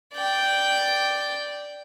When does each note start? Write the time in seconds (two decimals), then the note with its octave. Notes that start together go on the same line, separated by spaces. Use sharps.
0.14 D5 G5